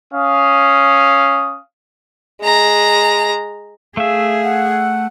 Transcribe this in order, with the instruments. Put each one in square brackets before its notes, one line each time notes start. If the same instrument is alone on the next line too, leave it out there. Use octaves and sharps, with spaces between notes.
[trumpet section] C#4 F5 D#6
[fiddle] G#3 A#5
[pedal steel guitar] A3 E5 [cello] G#4 [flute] F5
[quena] F#5